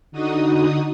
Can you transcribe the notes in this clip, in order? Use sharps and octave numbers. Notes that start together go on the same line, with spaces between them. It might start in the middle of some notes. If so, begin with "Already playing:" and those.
D3 D#4 F#4 D#6